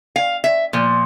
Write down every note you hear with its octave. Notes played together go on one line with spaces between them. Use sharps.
F5
E5
A#2 F3